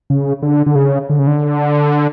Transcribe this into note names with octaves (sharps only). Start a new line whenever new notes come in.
C#3
D3
D3
C#3
D3
C#3
D3